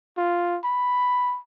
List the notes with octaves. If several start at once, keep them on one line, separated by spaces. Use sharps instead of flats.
F4
B5